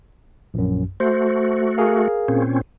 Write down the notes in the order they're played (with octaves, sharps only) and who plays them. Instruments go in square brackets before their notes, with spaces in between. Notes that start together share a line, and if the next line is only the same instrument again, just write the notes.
[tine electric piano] A#1 F#2
[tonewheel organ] A3 F#4 [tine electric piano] C5
[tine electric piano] G#4 A#4 F5
[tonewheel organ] A#2 C4 C#4